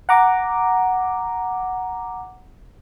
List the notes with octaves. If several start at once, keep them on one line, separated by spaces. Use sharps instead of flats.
F#5 A#5 D6